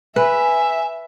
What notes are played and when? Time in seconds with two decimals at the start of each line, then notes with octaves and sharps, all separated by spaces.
0.16 B4 E5 G#5